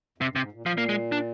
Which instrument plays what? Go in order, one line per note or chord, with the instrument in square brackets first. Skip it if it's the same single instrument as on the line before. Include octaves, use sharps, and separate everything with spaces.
[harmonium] F2 [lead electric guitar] C3
[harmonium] G2
[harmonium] G#2 [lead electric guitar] C3
[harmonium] A#2
[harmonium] A#2 [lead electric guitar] F3
[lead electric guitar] A#3
G#3
D4